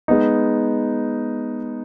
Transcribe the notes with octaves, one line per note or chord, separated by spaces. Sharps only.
G#3 B3 D#4